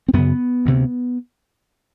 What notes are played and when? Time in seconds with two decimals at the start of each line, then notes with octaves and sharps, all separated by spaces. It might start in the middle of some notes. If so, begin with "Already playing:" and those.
0.08 C4
0.13 F#2 C#3 B3
0.65 D2 C3